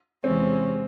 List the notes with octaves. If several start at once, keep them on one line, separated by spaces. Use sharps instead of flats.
E2 C3 E3 G#3 C4 C#4